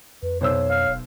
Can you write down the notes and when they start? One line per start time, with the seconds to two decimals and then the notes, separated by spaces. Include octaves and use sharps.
0.23 F2 B4
0.41 B1 C5 C#5 E6
0.70 F5
0.88 D#1